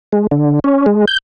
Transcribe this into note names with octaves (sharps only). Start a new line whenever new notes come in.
G#3
D3
C#4
G#3
G6